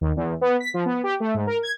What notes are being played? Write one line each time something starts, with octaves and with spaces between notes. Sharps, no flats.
D#2
E2
B3
B6
F3
B3
G4
A3
G#2
A#4
G#6